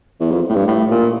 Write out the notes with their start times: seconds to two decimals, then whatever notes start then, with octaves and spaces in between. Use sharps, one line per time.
0.20 E2
0.31 F2
0.49 A2
0.55 G2
0.68 A2
0.91 A#2